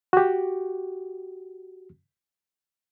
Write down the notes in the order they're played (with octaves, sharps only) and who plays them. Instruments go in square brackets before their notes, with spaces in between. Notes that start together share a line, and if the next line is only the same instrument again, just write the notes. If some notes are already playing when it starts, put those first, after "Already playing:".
[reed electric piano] F#4 G4